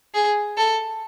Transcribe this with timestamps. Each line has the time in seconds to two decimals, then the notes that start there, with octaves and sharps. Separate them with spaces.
0.14 G#4
0.57 A4